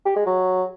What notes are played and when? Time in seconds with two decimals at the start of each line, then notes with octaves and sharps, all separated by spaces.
0.06 G4
0.16 G#3
0.26 F#3